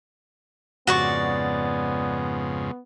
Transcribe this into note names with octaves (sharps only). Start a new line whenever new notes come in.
F2 G#2 C#3 B3 F#4 D5 C#6